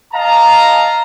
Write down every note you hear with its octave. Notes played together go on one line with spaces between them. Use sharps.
D#5 F5 A5 A#5